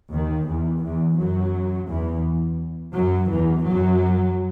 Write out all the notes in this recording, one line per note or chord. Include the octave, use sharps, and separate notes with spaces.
D#2 D#3
E2 E3
E2 E3
F#2 F#3
E2 E3
F#2 F#3
E2 E3
F#2 F#3